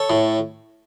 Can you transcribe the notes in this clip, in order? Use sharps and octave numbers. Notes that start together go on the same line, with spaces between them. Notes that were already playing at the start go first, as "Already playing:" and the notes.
Already playing: A4 C#5
A2